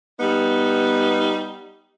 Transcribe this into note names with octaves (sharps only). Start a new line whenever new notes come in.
G3 B3 D#4